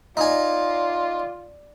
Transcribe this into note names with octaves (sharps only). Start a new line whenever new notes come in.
D#4 F4 D5 G#5